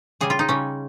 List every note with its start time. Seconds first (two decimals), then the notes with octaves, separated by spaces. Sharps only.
0.21 C#3 G3 G#4
0.30 F4
0.39 D#4
0.49 C#3 G3 C#4